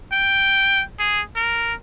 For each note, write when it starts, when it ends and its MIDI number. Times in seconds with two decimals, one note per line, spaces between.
0.13 0.83 79
1.00 1.21 68
1.36 1.74 70